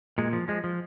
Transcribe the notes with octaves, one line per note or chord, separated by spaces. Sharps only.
A#2 G#3
F3
F3 G#3
F3